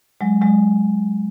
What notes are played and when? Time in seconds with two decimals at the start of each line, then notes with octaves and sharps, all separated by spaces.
0.21 F#3 G#3
0.42 F#3 G#3